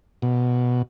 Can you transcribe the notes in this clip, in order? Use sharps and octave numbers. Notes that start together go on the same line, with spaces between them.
B2